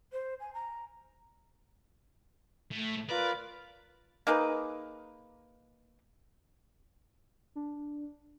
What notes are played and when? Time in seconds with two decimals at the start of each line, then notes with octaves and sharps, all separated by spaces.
0.12 C5
0.40 G#5
0.53 A#5
2.72 A2
3.09 F4 A#4 B4 D5
4.27 A#3 D#4 G#4 B4
7.56 D4